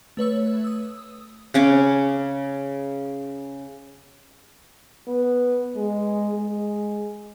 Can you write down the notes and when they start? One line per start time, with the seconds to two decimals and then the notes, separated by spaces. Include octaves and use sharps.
0.17 A3 B4 C#5 E6
0.64 D#6 E6
1.54 C#3 C#4 D6
5.08 B3
5.76 G#3
6.34 G#3